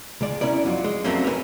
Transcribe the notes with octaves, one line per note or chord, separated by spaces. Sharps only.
C#2 G#3 D5
C#4 E4 A#4 D5
F2 F#3 F4
G#3
F2 F#3 A3 A#3 C4 C#4
A#4 B4 E5 G#5